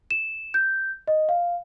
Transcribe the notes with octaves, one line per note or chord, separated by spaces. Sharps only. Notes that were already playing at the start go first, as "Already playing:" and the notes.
E7
G6
D#5
F5